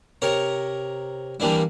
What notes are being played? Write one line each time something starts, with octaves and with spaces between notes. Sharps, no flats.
C3 A#4 C#5 A#5
E3 G3 A#3 D4 E4